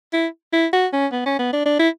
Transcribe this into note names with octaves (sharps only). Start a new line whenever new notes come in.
E4
E4
F#4
C#4
B3
C#4
B3
D4
D4
E4